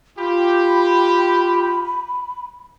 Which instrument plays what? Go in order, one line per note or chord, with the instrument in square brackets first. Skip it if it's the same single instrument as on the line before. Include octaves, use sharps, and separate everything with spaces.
[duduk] F4 [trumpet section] G4 [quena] B5